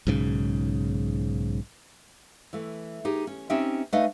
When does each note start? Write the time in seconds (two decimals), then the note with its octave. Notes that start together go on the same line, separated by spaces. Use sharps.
0.07 B1 G#2 C#3
2.53 E3 A3
3.05 D#4 G4 G#4
3.27 C#4
3.50 C4 C#4 D#4 G4 E5 G5
3.93 A3 D#4 B4 D#5 F5 G#5